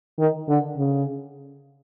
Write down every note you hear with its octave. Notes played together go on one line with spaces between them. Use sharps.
D#3
D3
C#3